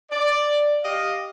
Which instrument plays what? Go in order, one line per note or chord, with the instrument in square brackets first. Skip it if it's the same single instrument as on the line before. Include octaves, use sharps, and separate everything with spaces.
[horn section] D5
G4 D#5 F5